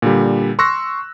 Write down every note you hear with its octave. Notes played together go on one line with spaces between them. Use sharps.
A#2 D3 G3
C6 C#6 E6 F#6 A#6